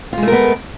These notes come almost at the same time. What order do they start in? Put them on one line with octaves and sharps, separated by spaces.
F4 G#3 A3 A#4 B3